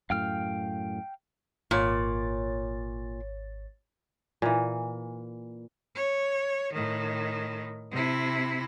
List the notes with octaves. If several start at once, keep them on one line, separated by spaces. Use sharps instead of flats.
F#2 A2 F5 G5 F6
G#1 A#2 C#5 A6
A#2 E3
C#5
A2 D#3
C3 E4